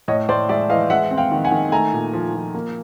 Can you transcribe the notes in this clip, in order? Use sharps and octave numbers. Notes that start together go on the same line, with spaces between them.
A2 C#5 D#5
A2 C5 D5
G#3 D5 E5
E3 D#5 F5
G#3 E5 F#5
C4
F5 G5
D#3
F#5 G#5
D#3
A3 G#5 A#5
A#2
F3
F3
A#3